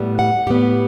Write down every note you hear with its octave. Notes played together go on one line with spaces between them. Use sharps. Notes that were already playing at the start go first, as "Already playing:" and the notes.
Already playing: A2 G3 B3
F#5
A2 G3 B3 G4